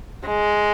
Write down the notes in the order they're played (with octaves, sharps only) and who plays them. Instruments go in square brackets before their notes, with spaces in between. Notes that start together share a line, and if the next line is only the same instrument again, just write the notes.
[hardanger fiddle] G#3